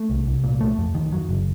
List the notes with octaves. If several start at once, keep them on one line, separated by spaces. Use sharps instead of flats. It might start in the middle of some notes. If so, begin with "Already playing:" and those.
Already playing: A3
C2
C2
A#2
A3
F2
D#3
F#3
F#1